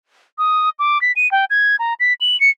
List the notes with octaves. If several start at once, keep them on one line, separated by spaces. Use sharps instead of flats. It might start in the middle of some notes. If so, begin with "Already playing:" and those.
D#6
D6
B6
D#7
G5
G#6
A#5
B6
F#7
C#7